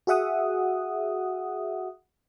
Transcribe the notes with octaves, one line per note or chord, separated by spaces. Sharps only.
F#4 G#4 E5 F#5 D#6